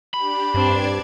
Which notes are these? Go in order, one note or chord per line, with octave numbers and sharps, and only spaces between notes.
D4 G4 B5
G2 C4 D4 D5 G#6